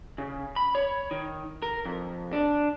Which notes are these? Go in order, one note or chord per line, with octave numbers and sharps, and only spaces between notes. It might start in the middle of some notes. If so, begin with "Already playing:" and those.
C#3
B5
C#5
D#3
A#4
F2
D4